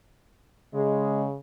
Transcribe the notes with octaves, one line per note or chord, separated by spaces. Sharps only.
C#3 G#3